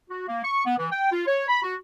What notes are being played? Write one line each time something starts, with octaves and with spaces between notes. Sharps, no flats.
F#4
A#3
C#6
B3
E3
G5
F4
C#5
B5
F#4